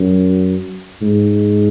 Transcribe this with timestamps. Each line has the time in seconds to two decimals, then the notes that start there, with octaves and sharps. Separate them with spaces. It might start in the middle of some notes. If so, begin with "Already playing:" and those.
Already playing: F#2
1.02 G#2